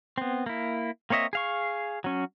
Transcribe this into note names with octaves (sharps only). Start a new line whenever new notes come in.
B3 C4
A#3 E4
A#3 C4 C#5 D#5 E5
G#4 F5 C#6
F#3 C#4